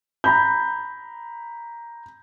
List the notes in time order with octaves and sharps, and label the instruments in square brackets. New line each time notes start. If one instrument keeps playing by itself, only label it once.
[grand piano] A#5 B5 G6